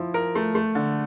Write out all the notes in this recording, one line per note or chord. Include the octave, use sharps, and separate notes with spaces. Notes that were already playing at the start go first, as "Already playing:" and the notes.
Already playing: F3 E4
A#4
A3
A3
D3